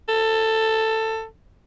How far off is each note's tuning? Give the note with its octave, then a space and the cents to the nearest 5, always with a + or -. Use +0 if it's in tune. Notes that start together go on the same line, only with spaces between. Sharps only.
A4 +15